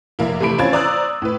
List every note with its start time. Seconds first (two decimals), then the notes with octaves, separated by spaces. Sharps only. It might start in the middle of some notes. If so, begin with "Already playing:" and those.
0.19 F1 A#3 E4
0.40 C3 E3 A3 B5 D7
0.58 C4 C#4 F4 G#6 A6
0.73 C5 D5 A#5 D#6 E6 F#6
1.22 A2 B4